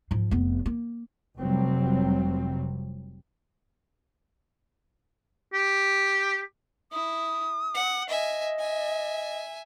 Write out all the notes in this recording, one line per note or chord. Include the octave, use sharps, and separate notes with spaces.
G#2 F3
F1 B3
A#3
F1 C3 F#3 G3 C4
G4
E4 D#6
F#5
D#5 E5 G#5
E5 G#5